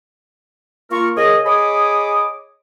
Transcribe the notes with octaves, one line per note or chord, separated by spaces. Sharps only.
A#3 F4 A#4 C#6
C#3 G#4 A#4 C#5 D#5
G#4 C#5 D#5 B5 D6 D#6